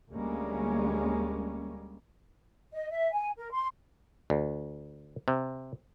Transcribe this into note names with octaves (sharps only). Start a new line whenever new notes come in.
D2 G3 G#3 A#3 C#4
D#5
E5
G#5
A#4
C6
D2
C3